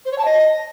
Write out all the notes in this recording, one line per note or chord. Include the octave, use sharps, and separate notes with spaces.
C5
C#5
A5
D#5